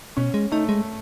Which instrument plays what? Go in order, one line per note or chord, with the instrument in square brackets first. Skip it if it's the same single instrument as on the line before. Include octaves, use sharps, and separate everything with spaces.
[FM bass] B2 [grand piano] C#4
[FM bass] G#3
[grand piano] A3 [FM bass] D#4
[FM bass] G#3